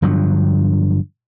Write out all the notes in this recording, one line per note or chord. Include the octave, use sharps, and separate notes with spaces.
G2 D3 F3 F#3